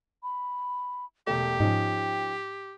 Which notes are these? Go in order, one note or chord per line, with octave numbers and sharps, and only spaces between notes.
B5
E1 A3 G4 G5
G#2 F3 C#4 D#4